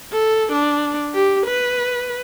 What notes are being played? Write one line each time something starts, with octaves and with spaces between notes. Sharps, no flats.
A4
D4
G4
B4